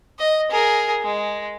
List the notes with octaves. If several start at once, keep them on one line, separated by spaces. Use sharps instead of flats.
D#5
G#4 A#4
G#3